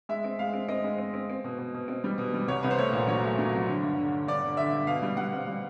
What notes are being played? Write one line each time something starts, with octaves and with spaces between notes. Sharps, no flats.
G#3 E5
C4
G#3 F5
C4
C4 D#5
G#3
C4
C4
C4
B2
B2
B2
C4
G3
B2
G3
C2 C#5
C2 B4
C5
A3 C#5
A#2
F#3 C#5
A3
F#3
C2
D3
G2
D3
D3
G2 D5
D3
D3 E5
G2
B2 F5
G3
G3 F#5
C4
G3